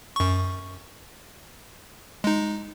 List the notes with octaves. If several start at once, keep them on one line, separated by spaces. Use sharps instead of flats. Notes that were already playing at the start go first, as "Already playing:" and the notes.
F#2 C#6
G#3 D#4